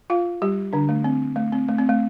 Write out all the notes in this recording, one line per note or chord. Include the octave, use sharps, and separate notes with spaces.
F4 F5
G3 G4
D3 D4
A3
C4
A3
C4
A3
C4
A3